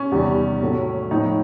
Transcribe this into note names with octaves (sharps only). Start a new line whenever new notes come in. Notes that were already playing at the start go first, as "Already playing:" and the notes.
Already playing: C#4
E2 C3 D#3 G3
A2 F#3 A3
A2 F3 A3 D#4